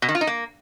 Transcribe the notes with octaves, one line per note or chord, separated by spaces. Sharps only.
B2
D#3
F4
D#4
A#3